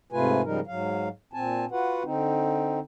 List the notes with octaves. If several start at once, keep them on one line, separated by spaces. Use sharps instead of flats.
G#2 C3 A3 F4 B4 G#5
G#2 C#3 F3 G3 D#4 A#4
G#2 F#3 F5
A#2 C4 G#5 A5
F4 F#4 B4 F#5
D3 C4 D#4